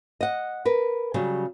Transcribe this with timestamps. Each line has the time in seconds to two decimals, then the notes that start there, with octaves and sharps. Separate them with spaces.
0.21 D#5 F#5
0.65 A#4 B4
1.14 C#3 F#3 G3